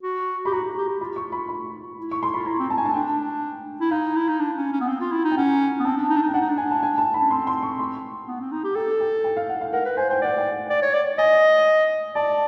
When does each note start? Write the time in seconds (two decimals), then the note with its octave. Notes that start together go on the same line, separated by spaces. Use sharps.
0.03 F#4
0.45 G4 B5
0.52 F#4 A#5
0.64 F#4
0.77 G4
0.88 G4
1.00 F4 B5
1.16 C#6
1.32 B5
1.49 B5
1.98 E4
2.11 C#6
2.23 C6
2.34 F4 B5
2.46 E4 A#5
2.59 C4
2.70 A5
2.78 G#5
2.83 D4 A5
2.94 D4 G5
3.81 E4
3.91 D#4 F5
4.16 E4
4.28 D#4
4.40 D4
4.56 C#4
4.72 C#4
4.81 B3
4.88 C4
5.01 F4
5.12 E4
5.24 D#4
5.31 G5
5.37 C#4 F#5
5.79 B3
5.85 C4 A5
5.97 D4
6.09 D#4
6.16 D4
6.22 D#4
6.28 G5
6.33 D4 F#5
6.41 D#4
6.48 D4
6.57 G#5
6.71 A5
6.83 G#5
6.98 A5
7.14 B5
7.21 C#4
7.30 C4 C6
7.47 C6
7.63 C#6
7.79 C6
8.27 B3
8.40 C4
8.52 D#4
8.64 G4
8.75 A4 G5
9.00 G5
9.24 G5
9.37 F5
9.49 F#5
9.61 F5
9.73 A#4 F#5
9.85 B4
9.97 C5 G#5
10.10 C5 G5
10.21 D5 F#5
10.37 G5
10.70 D5
10.82 C#5
10.93 D5
11.18 D#5 G#5
12.15 D5 A5